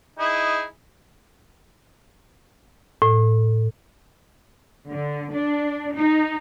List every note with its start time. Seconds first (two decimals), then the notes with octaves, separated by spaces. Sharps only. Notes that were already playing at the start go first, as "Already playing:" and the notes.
0.19 D#4 E4 G#4
3.02 A2
4.88 D3
5.33 D4
5.95 D#4